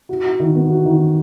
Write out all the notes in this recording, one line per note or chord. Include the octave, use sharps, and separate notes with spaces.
F#4
F#4
D#3
B3
F#4
D#3